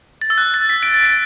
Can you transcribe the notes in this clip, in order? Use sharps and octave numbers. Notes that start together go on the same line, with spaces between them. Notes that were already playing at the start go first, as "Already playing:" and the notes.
A6
E6
F#6
A6
B6
A6 D7
A6 D7
B6